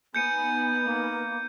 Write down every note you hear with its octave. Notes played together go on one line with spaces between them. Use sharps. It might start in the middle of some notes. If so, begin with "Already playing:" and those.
B3 D#4 G#5 G6 C#7 D#7
A#3